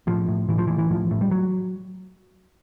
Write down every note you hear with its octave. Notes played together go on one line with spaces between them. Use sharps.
A2 F3
A2
A2 E3
F3
A2 E3
E3
A2 F3
A2
G3
F#3